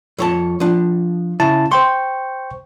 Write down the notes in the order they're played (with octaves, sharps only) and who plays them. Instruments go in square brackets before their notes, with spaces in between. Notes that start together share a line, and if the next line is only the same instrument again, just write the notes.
[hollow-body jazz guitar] F2 C#5 A5
F3 D4
[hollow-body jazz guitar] C#3 [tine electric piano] E4 A5
[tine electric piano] C5 G5 C#6 [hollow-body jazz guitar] C6